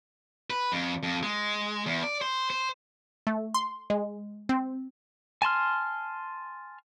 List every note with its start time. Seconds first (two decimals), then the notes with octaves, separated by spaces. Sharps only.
0.50 B4
0.72 F2
1.03 F2
1.23 G#3
1.86 E2
2.03 D5
2.21 C5
2.50 C5
3.27 A3
3.54 C6
3.90 G#3
4.49 C4
5.42 G#5 A5 C6 F6